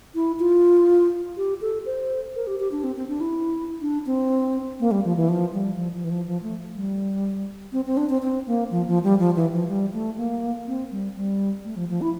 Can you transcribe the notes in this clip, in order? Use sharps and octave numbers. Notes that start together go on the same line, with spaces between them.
E4
F4
G4
A4
C5
A#4
G4
G4
D4
C4
C4
D4
E4
D4
C4
A#3
G3
F3
E3
F3
G3
F3
F3
E3
F3
F3
A3
G3
C4
C4
D4
C4
C4
A#3
F3
F3
G3
F3
E3
F3
G3
A3
A#3
C4
G3
G3
A3
F3
F3
E4